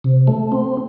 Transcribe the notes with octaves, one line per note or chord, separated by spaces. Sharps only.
C3
A3
C4